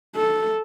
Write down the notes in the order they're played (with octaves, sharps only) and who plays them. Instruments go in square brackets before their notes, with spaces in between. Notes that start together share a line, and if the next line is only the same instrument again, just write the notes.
[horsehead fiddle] A4